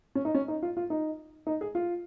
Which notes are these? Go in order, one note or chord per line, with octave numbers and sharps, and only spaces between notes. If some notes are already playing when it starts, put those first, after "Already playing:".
C#4
D#4
C#4
D#4
F4
F4
D#4
D#4
G#4
F4